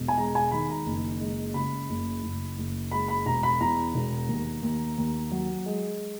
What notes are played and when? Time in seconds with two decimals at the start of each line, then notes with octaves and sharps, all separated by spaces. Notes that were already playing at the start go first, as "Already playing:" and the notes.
Already playing: E1 B2
0.08 G#5
0.18 G#3 A#5
0.35 G#5
0.51 D#3 B5
0.69 A#5
0.86 F#1
1.21 G#3
1.54 C#3 B5
1.90 F#1
2.23 F#1
2.58 F#1
2.92 G#3 B5
3.08 B5
3.26 E1 A#5
3.43 B5
3.61 E2 A#5
3.95 E1
4.29 D#2
4.63 D#2
4.98 D#2
5.31 F#3
5.66 G#3